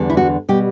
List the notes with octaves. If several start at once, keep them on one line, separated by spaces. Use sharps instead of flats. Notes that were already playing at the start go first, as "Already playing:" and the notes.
Already playing: E2 D3 G3
E4
F#4
B2 G3 G4